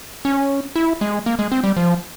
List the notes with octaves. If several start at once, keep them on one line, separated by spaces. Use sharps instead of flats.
C#4
E4
G#3
A#3
G#3
C4
G3
F3